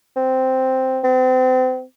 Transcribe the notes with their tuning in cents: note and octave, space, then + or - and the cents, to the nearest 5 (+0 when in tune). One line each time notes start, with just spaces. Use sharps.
C4 -5
C4 -35